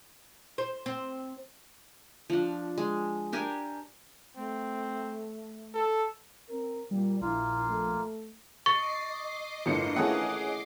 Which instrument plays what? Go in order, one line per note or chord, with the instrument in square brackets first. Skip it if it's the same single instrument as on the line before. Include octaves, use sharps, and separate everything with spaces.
[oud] C5
C4
[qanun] F3 D4
G#3
D4 G4 A#4 G#5
[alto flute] A3 [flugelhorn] C4
[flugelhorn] A4
[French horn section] C4 A#4
[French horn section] A#2 [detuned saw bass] G3
[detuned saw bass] A#1 [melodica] A#3 F4 [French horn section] E4
[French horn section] A3
[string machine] D#5 D6 C7 [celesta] C#6 [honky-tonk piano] A6
[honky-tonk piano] G1 A2 C#7 [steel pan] A#3 F4
[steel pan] E3 A3 A#3 [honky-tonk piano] C#4 G#4 F#5